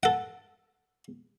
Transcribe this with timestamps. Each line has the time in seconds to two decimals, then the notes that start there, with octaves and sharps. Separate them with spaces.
0.03 A4 F#5